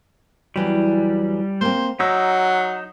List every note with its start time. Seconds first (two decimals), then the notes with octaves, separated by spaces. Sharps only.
0.56 E2 E3 F#3 G3
1.61 A#3 C4 C5
2.00 F#3 D#4 D5 E6